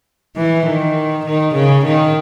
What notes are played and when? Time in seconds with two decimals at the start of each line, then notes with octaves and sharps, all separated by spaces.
0.36 E3
0.66 D#3
1.25 D#3
1.55 C#3
1.85 D#3